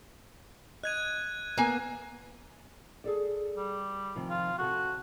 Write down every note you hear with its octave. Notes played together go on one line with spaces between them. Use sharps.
D#5 F#6 G#6 D#7
A#3 B3 A#4 G#5
G#4 A4 D5
G3
C3 D#3 F3
F4
C3 F#4 A4 A5